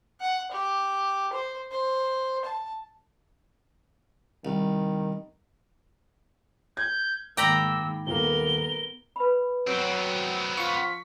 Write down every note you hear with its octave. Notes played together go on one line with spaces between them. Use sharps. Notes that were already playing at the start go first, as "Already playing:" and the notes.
F#5
G4
C5
C5
A5
C2 D#3
G6 G#6
G#2 D#3 A#3 G5 A#5 B5 D6 E6
D#1 A#3 B3 A#4 G7
B4 B5
F#3 B3 C4
F3 F4 C#6 B6